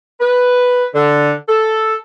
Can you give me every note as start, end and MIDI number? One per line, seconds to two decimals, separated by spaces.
0.19 0.84 71
0.94 1.31 50
1.48 1.94 69